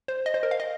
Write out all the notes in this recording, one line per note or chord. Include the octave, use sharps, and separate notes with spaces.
C5
D#5
C5
A#4
F5
D#5